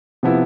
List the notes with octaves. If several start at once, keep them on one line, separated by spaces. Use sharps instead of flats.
C3 F3 B3 E4